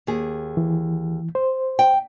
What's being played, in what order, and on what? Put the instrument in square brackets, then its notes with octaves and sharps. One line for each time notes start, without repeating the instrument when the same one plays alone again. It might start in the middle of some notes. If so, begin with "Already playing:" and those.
[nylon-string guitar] D#2 G#4
[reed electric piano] E3
C5
[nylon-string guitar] G5